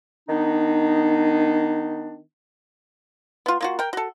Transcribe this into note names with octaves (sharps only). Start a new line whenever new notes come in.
D#3 B3 D4 D#4
B3 F4
A#3 F4 F#4
A#4 G5
F#4 A4